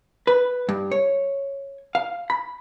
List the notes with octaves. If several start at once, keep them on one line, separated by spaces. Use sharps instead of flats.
B4
G2
C#5
F5
B5